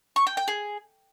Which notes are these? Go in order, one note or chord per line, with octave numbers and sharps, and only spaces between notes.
C#6
G5
G5
G#4